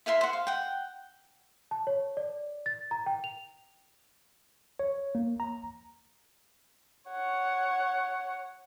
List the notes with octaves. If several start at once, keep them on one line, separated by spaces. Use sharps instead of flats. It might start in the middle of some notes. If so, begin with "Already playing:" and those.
E4 A#4 E5 C6
C5 F#5
F5
F#5 G5
A5
C#5
D5
A6
A#5
G5
F7
C#5
A#3
A#5
C#5 F#5